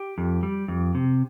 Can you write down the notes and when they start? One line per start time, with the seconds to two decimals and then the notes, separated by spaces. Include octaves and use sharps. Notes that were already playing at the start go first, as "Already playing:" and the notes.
Already playing: G4
0.18 F2
0.43 G3
0.68 F2
0.95 C3